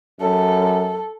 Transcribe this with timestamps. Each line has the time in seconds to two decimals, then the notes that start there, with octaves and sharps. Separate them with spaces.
0.21 F#2 A4